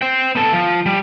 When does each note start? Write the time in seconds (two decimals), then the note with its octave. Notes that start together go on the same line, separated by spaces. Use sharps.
0.02 C5 G5
0.36 B3 A4
0.53 F3
0.86 G3